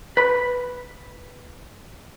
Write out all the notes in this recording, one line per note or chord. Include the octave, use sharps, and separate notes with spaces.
B4 B5